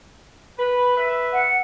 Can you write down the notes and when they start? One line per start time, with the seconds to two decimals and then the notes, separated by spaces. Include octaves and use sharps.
0.58 B4
0.96 B4 E5
1.33 F#5